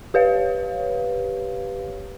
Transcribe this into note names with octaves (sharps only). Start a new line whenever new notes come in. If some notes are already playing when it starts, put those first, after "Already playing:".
G4 B4 C#5 F5